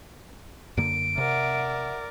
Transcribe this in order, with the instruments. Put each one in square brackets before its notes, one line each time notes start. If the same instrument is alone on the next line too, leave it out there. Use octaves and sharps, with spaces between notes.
[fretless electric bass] F#2 D3 A#3 [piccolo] D7
[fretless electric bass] C3 [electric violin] A#4 D5 [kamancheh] E5 F#5